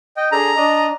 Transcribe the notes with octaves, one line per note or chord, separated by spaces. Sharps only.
D#5 G5
D4 G#4 A4 A#5
D4 D#5